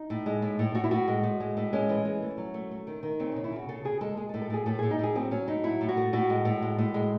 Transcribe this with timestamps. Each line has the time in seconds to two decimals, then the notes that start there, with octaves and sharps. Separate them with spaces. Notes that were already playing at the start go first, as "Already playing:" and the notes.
Already playing: D#4
0.10 A2
0.26 G#3
0.42 A2
0.59 A2
0.75 A2 F#4
0.84 E4
0.91 A2 F#4
1.08 G#3
1.23 A2
1.40 G#3
1.57 A2
1.73 G#3 C#4
1.89 E3
2.05 G#3
2.22 A3
2.38 F#3
2.54 A3
2.71 A3
2.87 D#3
3.03 D#3
3.20 C#3 C4
3.32 C#3 C#4
3.44 E4
3.52 C#3 F#4
3.69 C#3 A4
3.84 C#3 G#4
4.01 G#3 A4
4.17 G#3 G#4
4.29 A4
4.34 A2
4.42 A4
4.50 A2 G#4
4.66 A2 A4
4.79 A2 G#4
4.91 D#4
4.99 A2 G#4
5.15 F#3 C4
5.31 F#3 C#4
5.48 A2 D#4
5.64 F#3 E4
5.81 A2
5.89 F#4
5.97 A3
6.13 A2 F#4
6.30 G#3
6.45 A2
6.62 G#3
6.78 A2
6.94 G#3